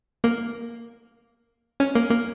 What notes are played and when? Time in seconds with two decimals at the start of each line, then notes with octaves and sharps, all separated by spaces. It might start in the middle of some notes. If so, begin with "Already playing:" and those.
0.24 A#3
1.80 C#4
1.95 A#3
2.11 A#3